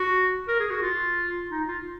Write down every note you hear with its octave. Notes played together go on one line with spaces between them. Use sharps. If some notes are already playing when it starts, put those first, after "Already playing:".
Already playing: F#4
A#4
G#4
F#4
F4
D#4
F4